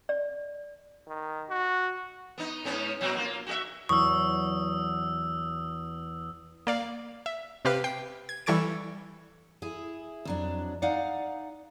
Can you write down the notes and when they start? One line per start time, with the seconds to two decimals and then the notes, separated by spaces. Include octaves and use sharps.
0.09 D5
1.08 D#3
1.49 F#4
2.38 B3 D#4
2.64 G#2 B3 C#4
3.01 A#2 F#3 C4
3.15 A#3 F4
3.47 F#4 G4 E5
3.89 E2 F#3 C#6 D#6 E6
6.67 A#3 D5 F5
7.26 E5
7.65 C3 C4 G4 B4 F5 F6
7.84 G5 C7
8.29 G#6
8.46 E3 G3 A4 C#6 G#6 D7
9.62 E4 G#4
10.25 F2 F#3 D4
10.82 D#4 D5 F5 F#5